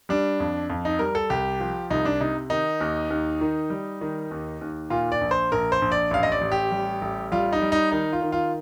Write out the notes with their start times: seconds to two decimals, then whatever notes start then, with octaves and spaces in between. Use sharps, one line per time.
0.09 G3 D4
0.40 F2
0.70 F2
0.85 D#4
0.99 G3 A#4
1.15 A4
1.30 C2 G4
1.60 F3
1.90 C2 D#4
2.05 D4
2.21 C3 D#4
2.50 D#3 D#4
2.80 D#2
3.10 D#2
3.41 D#3
3.70 G3
4.01 D#3
4.31 D#2
4.61 D#2
4.90 A#2 F4
5.12 D5
5.21 A#1
5.31 C5
5.52 A#1 A#4
5.72 C5
5.82 A#1
5.92 D5
6.11 A1 F5
6.23 D#5
6.32 D5
6.41 A1
6.52 G4
6.71 G3
7.01 A1
7.32 G3 F4
7.53 D#4
7.62 G3
7.72 D#4
7.92 D#3 D#4
8.13 F4
8.22 D#3
8.32 F4